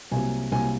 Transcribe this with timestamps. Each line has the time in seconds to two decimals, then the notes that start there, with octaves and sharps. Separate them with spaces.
0.11 C2 C3 F#3 A#3 G#5
0.51 C2 C3 F#3 A#3 G#5